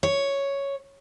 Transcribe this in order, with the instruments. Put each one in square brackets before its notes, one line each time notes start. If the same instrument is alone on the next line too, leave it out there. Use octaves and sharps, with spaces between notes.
[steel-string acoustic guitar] C#5